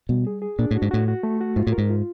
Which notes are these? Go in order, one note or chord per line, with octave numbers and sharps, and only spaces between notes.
B2 G3
G#4
G#4
A#2 D4
A2 F#4
G#2
A2 F#4
F#4
A3
F#4
G#2 F4
A2
A#4
G#2
F4